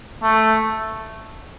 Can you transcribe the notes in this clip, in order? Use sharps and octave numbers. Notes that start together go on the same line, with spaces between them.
A3